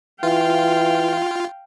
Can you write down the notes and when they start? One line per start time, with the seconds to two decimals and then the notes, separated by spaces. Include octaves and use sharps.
0.23 E3 F4 F5 G5